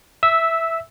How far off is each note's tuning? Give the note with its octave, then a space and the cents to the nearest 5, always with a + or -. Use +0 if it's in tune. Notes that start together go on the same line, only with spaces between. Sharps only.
E5 +0 E6 -15